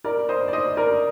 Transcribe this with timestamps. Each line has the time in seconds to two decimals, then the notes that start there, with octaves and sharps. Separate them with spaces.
0.04 A#4 D5
0.29 C5 D#5
0.48 D5
0.53 C5 D#5
0.77 A#4 D5